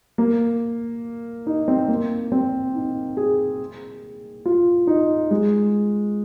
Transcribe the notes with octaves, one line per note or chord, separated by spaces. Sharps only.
A#3
D#4
C4
A#3
C4
D#4
G#4
F4
D#4
G#3